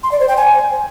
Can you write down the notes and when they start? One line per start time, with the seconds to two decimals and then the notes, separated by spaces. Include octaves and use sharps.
0.03 C6
0.12 D5
0.20 C5
0.28 G5
0.37 G#5